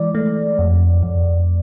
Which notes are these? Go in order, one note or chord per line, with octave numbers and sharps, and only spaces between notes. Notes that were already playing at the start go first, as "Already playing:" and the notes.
Already playing: E3 G#3 D5
A3
F2
F2